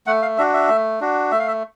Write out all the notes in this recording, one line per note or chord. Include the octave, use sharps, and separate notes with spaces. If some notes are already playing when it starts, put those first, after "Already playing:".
A3 F#5
F5
D4 F#4 E5
E5
A3
D4 F#4
A3 E5
F5
E5